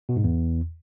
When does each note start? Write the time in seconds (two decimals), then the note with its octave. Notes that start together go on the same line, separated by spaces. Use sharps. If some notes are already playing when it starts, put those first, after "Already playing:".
0.09 B2
0.16 G#2
0.24 E2